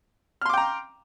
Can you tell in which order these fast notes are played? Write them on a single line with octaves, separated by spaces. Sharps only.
F6 C6 D6 G5 A#5